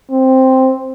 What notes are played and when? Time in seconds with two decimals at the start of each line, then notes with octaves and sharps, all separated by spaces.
0.10 C4